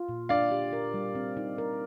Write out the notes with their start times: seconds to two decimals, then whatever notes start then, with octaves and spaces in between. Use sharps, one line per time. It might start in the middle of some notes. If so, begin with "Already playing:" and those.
Already playing: F4
0.09 A#2
0.29 D4 D5 F5
0.51 G4
0.73 A#4
0.94 G3
1.15 C4
1.37 D#4
1.58 A#4